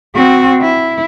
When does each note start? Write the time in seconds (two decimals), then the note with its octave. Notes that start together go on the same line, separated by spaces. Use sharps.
0.15 C4 F#4
0.61 E4